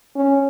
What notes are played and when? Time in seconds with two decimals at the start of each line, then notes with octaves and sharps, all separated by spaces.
0.16 C#4